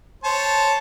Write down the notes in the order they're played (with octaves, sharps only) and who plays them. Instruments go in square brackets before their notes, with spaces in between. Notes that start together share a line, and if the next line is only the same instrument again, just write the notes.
[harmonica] C5 C#5 A5